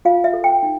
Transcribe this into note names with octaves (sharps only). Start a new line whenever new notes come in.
F4 F5
E5
A4
G5
D#4